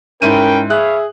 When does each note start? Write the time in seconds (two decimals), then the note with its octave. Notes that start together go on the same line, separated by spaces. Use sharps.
0.22 G#2 C#4 E4 A#4 B4 G5 D#7
0.70 G#4 B4 C#5 E5 F5 F#6